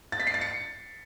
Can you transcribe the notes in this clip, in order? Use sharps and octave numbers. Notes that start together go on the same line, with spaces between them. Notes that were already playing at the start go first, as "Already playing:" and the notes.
A6
B6
C7
A6
C#7